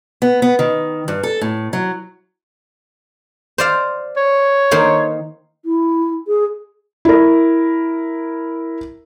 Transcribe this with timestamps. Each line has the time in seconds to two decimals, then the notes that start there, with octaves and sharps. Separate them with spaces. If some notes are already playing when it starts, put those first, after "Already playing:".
0.22 B3
0.42 B3
0.59 D#3
1.08 G2
1.23 A4
1.41 A2
1.73 F#3
3.58 C5 D5 F5
4.17 C#5
4.71 D#3 A#3 C5
5.65 E4
6.27 G#4
7.05 E4 A#4